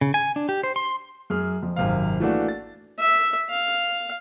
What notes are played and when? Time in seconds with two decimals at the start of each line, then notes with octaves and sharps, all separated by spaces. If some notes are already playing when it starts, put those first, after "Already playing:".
0.01 C#3
0.14 G#5
0.36 D4
0.49 G4
0.63 C5
0.76 C6
1.30 F#2 G#4 F6
1.63 F2
1.76 G#1 F#2 C3 F5
2.20 E3 A3 A#3 D4 F#4
2.48 A6
2.99 E5
3.49 F5